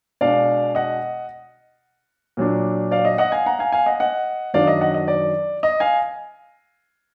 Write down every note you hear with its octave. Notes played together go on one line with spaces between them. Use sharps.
B2 G#3 D4 D5 F5
D#5 F#5
A#2 F#3 D4
D5 F5
D#5
D#5 F#5
F5 G#5
F#5 A#5
F5 G#5
F5 G#5
D#5 F#5
D#5 F#5
F#2 D#3 F#3 D4 D5 F5
D#5
D#5 F#5
D#5
D5
D#5
F5 G#5